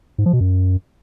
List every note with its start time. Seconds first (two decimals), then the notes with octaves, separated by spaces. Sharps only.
0.18 G#2
0.26 F3
0.33 B2
0.40 F#2